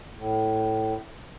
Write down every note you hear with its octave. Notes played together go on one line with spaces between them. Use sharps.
A2